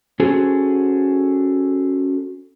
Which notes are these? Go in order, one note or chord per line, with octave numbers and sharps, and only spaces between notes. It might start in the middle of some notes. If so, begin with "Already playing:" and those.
C#4 F#4 G#4 A4 C5